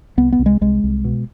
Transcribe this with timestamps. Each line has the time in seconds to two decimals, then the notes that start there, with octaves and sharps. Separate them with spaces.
0.17 C2 B3
0.32 B3
0.39 C2
0.46 G#3
0.61 C2 G#3
0.84 C2
1.05 B2